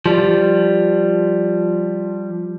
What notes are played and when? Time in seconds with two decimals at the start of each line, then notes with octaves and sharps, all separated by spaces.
0.06 F3 G3